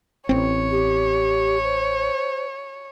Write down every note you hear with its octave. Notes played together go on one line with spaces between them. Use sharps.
A1 C4 C#5
G4
C5